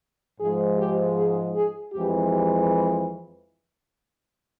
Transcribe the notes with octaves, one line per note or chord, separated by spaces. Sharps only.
G#2 F3 G#3 G#4
G4
G#4
G#4
F2 E3 G#3 G4
G4